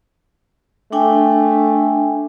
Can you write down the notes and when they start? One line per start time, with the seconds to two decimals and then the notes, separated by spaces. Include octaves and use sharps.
0.92 A3 D4 G5 G#5